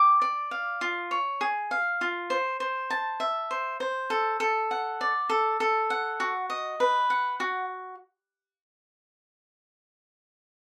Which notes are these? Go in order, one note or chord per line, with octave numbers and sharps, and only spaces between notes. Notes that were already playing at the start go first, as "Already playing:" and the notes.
Already playing: G5 D6
D5
F5
F4
C#5
G#4
F5
F4
C5
C5
A5
E5
C5
C5
A4
A4
F#5
D5
A4
A4
F#5
F#4
D#5
B4
F#5
F#4